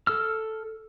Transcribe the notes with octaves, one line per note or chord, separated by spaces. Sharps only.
A4 E6 F6